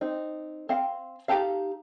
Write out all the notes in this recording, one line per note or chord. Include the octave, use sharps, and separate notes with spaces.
C4 D#4
C4 F5
D#4 G4 A4 F5